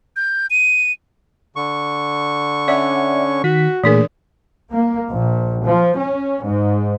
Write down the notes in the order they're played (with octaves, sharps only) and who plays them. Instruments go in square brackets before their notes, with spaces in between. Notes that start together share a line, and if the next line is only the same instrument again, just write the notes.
[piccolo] G6
D#7
[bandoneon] D3 C#6
[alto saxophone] C#4 [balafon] C#5 [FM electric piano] D5 E5 F#5
[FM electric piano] D#3 B6 [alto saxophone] F#4
[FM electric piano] A#2 A3 G#4 [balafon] E3 D4 A#4
[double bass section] A#3
A#1
F3
C#4
G#2